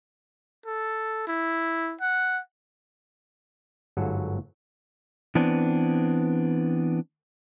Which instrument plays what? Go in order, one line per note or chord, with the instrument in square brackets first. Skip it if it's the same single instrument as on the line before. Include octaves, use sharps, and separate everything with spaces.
[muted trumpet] A4
E4
F#5
[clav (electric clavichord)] G1 G#2 F#3 F#4 A4
[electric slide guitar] E3 B3 C4 D4